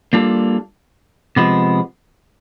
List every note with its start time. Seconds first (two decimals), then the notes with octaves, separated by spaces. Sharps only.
0.13 G3 A#3 D4 F4 A4
1.36 C3 F3 G#3 B3